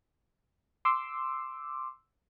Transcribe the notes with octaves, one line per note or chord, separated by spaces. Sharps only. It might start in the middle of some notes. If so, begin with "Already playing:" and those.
C6 D6 E6